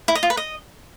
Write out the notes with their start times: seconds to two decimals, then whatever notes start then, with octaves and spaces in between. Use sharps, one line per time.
0.08 E4
0.15 D#5
0.23 F4
0.30 B4
0.37 D#5